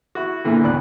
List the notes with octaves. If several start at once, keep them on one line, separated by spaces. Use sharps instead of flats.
E4 F#4
A#2 D3 E3 A#3
G#1 D2 B2 D5 F#6